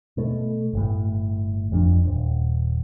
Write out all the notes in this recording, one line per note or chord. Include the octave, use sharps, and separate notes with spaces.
B2 A3
G1 A2
F2 F3 D4
D#1